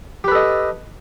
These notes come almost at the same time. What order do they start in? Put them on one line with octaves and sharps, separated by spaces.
G4 B4 A4 D#5